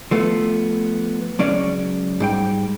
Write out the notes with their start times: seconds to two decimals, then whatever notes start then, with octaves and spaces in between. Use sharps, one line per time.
0.11 F3 A3 B3
1.39 C#2 F#3 C#4 D5
2.20 G#2 G3 G5